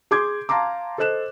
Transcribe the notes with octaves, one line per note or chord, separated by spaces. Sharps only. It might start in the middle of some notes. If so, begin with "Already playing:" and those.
G#4 C6 D6 G6 G#6
F5 A5 A#5 C6 D6
A4 C5 D#5 F#6 E7